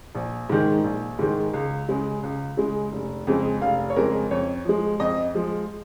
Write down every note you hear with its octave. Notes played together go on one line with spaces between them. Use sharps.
A#1
G#2 D#3 G#3
A#1
G#2 D#3 G#3
C#2
C#3 G#3
C#2
C#3 G#3
F1
F2 C#3 G#3
F1 F5
C#5
F2 C#3 G#3 A#4
F2 C#5
F3 G#3
F2 D#5
F3 G#3